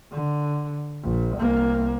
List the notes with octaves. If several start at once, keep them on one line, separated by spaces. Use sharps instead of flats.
D3
A#1
C2 A#3